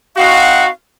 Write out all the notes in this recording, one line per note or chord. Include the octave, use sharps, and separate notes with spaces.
C4 D#4 F#4 F5